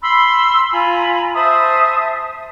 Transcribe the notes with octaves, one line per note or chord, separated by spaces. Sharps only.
B5 C6 E6
F4 G#5 A#5 B5
C5 E5 A5 D#6